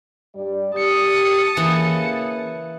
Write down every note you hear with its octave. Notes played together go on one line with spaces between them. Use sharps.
G2 G3 D5
G4 A5 D#6 C#7
C#3 E3 A#3